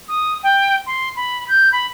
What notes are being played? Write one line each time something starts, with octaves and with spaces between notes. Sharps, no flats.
D#6
G5
C6
B5
G6
B5